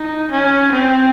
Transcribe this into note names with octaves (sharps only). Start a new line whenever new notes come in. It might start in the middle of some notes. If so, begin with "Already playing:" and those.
Already playing: D#4
C#4
C4